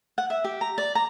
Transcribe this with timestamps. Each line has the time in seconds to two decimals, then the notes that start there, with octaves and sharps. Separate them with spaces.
0.18 F#5
0.30 E5
0.44 G4
0.61 A#5
0.78 D5
0.95 A#5